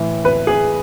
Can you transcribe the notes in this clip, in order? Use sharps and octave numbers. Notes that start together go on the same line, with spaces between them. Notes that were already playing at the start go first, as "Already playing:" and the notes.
Already playing: A2 E3
B4
G#4